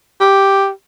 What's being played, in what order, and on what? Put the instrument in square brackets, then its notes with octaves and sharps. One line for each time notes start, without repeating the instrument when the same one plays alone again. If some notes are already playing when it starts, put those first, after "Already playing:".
[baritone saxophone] G4